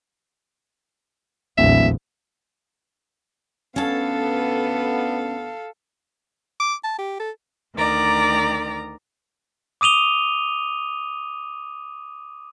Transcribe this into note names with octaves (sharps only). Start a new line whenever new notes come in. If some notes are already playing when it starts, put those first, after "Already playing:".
D1 A#1 E2 E5
D2 D3 B3 C#4 A4 F5 A5
D6
A5
G4
A4
D2 D#3 D5 A#5
D6 D#6 D#7 F7 G7